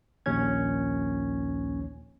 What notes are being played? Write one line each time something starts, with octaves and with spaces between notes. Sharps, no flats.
A#1 D#2 C#4 G#6